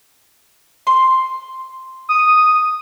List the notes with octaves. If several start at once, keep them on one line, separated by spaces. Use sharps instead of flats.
C6
D#6